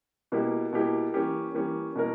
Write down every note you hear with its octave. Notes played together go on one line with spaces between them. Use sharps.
B2 A#3 E4 G4
B2 A#3 E4 G4
E3 A#3 C#4 G4
E3 A#3 C#4 G4
B2 A#3 C#4 E4 A#4